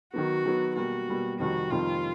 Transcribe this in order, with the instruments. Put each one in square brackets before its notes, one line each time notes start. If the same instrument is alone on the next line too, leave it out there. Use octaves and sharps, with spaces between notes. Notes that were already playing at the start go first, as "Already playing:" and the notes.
[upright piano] D#3 F#3 B3 [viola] F#4
[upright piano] D#3 F#3 B3
[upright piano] B2 G3 A#3 [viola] F#4
[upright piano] B2 G3 A#3
[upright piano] F2 C3 D#3 G3 [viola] F#4
[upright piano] F2 C3 D#3 G3 [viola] F4